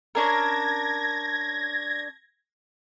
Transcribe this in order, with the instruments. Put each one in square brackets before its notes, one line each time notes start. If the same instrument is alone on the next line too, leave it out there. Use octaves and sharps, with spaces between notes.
[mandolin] C#4 D4 A#4 [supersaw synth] G#6 A#6